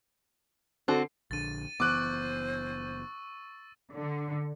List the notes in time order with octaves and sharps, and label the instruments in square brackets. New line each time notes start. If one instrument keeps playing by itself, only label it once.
[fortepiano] D3 [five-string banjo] C4 F#4 A4
[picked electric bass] A#1 D3 [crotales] A6 D#7
[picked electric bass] F#1 E3 B3 [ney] C5 [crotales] C#6 E6 [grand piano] D6 F#6
[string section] D3